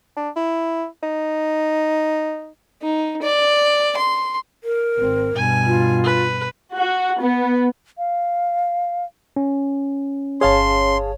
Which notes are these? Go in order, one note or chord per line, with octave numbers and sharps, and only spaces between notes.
D4
E4
D#4
D#4
D5
C6
A#4
G#1 C4
G2 B2 G#5
F4
B4
F#4
B3
F5
C#4
G1 G#4 C#5 F5 A5 C6